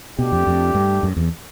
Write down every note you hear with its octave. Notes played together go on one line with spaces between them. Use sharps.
B2 A3 D4 G4
F2
F2
G2
F#2
E2